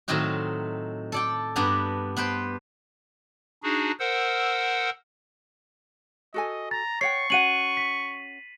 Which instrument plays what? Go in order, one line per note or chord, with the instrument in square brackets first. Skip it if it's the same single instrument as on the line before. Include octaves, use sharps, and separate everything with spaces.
[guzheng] A2 D#3 F#3 C4 D#4 F#4
A4 D5 G5
G2 B3 D4 G4 A#5
B3 B4 C5 G5
[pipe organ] D4 D#4 F#4 G#4
A#4 C5 F#5 E6
[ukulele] F#4 A4 G#5 [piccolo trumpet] D#5
[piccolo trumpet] A#5 [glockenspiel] A6
[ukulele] C#5 F#5 G5 [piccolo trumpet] C#6 [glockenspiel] C7
[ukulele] C#4 F#4 F#5 [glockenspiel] D#7 F#7
[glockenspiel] B6